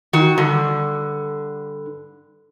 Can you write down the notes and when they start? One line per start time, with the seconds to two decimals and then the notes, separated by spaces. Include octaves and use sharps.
0.13 D#3 F#4
0.37 G2 D3